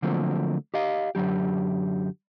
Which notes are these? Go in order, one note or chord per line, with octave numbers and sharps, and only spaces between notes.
D3 F3 F#3 A3 A#3 C4
G4 D#5 F5
F#2 D3 F#3 G4